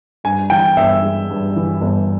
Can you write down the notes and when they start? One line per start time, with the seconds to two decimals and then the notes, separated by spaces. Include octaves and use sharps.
0.24 G2 G#5
0.50 E3 G5
0.76 G1 E5
1.02 G#3
1.30 G2
1.56 E3
1.81 G1